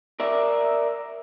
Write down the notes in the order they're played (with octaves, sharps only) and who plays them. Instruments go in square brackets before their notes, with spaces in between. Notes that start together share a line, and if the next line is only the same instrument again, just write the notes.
[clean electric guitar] A#4 D5 E5